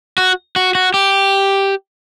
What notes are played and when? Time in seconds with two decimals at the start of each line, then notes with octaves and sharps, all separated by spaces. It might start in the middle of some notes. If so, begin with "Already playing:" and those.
0.18 F#4
0.56 F#4
0.75 F#4
0.94 G4